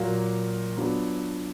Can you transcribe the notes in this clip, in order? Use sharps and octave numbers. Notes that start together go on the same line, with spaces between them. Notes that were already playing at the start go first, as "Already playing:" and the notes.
Already playing: A#2 F#3 A#3
F#3 B3 D4 F4